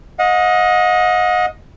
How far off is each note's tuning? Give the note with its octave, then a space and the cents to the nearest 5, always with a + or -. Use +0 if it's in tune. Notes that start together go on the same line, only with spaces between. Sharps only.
D#5 +15 F#5 -40